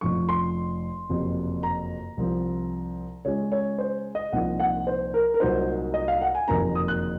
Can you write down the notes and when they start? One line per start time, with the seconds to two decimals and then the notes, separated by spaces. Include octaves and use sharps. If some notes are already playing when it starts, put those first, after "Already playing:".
0.01 F1 F2 C#3 F3 C#6
0.29 C6
1.10 F#1 F2 C3
1.63 A#5
2.17 C2 C3 F3 C4
3.25 C#2 C#3 G#3 C#4 C#5
3.52 C#5
3.78 C5
4.15 D#5
4.32 C2 A#2 F3 C4 D#4 F#5
4.60 F#5
4.87 C5
5.14 A#4
5.34 A#4
5.40 C2 A#2 F#3 A#3 D#4 C5
5.94 D#5
6.08 F5
6.21 F#5
6.35 G#5
6.48 F#1 F2 C3 D#3 A#3 A#5
6.75 D#6
6.88 F#6